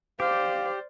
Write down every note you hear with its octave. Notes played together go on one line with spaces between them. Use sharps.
G4 C5 D5 F5 D6 F6